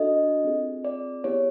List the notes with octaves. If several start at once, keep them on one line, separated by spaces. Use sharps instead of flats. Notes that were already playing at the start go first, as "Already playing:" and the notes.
Already playing: D4 F#4 A4 D#5
C4 F4 G#4
D5
B3 E4 G4 C#5